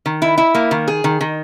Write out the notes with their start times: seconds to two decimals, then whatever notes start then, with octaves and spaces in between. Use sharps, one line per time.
0.06 D#3
0.22 E4
0.38 E4
0.55 A#3
0.71 D#3
0.88 G#4
1.04 D#3
1.21 D#3